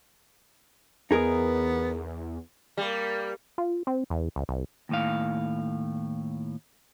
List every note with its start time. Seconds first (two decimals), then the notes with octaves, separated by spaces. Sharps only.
1.11 E2 B3 D#4 G#4 A#4
2.77 G3 A#3
3.58 F4
3.87 C4
4.10 E2
4.36 C#2
4.49 C2
4.89 D#2 A2 F5